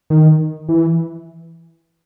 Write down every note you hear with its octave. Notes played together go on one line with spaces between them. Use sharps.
D#3
E3